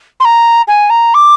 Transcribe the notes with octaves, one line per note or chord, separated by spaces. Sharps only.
C6
A#5
G#5
A#5
D6